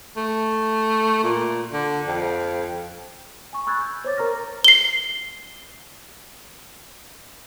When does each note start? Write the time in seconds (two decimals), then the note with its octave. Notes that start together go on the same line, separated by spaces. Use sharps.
0.17 A3
1.24 A#2
1.73 D3
2.07 F2
3.53 G#5 C#6
3.66 B5 C#6 E6 F#6 G#6 A6
3.81 G6
4.05 C5 C#5 D6 A6
4.17 A#4 A#5 C#6 F6 A#6
4.64 C7 G7